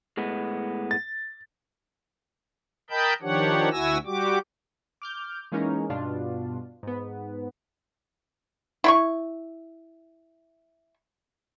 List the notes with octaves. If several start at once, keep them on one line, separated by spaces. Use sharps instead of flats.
A2 G#3 B3
A6
A#4 D#5 G5 A5 B5 G6
D#3 F3 D4 G4 C#5 F#5
D2 E4 F#4 G#5 E6 A#6
G3 F#4 G4 D6
D6 F6 G6
E3 G#3 A#3 C#4 D#4 A#4
G2 B2 D4 F4
G#2 B3
E4 B5 C#6